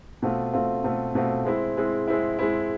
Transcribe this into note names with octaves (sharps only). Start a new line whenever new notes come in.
B2 A3 C4 F4
B2 A3 C4 F4
B2 A3 C4 F4
B2 A3 C4 F4
G#3 C4 E4
G#3 C4 E4
G#3 C4 E4
G#3 C4 E4